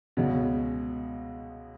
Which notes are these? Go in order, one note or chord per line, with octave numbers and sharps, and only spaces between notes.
C#2 B2 G#3 C#4